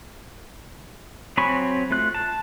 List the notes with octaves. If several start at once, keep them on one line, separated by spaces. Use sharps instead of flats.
F#3 C4 G#5 B5 C#6
A3 F4 F#6
A5